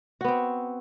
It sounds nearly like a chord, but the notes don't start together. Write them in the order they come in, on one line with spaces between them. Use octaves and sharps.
F#4 B3 C4